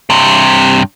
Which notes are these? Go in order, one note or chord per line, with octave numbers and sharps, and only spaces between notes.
G2 C3